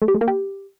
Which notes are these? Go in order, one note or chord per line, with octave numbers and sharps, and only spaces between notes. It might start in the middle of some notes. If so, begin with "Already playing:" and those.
A3
G4
A3
A#3
G4